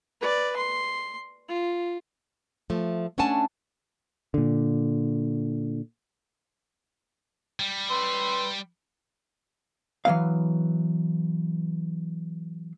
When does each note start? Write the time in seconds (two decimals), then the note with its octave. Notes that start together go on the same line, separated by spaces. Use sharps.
0.21 B4 D5
0.56 C6
1.49 F4
2.70 F3 A3
3.18 A3 C#4 D4 F#5 G#5 A5
4.34 A#2 D3
7.60 G3
7.91 B4 C6 E6
10.05 E3 F#3 B3 F5